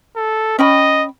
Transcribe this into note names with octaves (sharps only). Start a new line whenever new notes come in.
A4
C#4 D#5 G5 B5